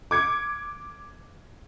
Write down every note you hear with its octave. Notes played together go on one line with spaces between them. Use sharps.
D6 G#6 C#7